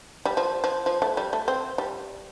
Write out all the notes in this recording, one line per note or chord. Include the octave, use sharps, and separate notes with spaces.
G3
F3
F3
F3
A3
G3
A3
C4
G3